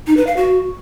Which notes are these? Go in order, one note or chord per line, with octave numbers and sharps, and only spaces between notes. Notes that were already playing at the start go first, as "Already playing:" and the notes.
D#4
B4
F5
F#4